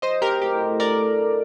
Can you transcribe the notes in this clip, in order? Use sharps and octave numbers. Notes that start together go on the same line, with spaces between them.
F#3 C5 D#5
C4 G4 A#4
A2 G4
A2
D3 A#4 D5
A3
D#4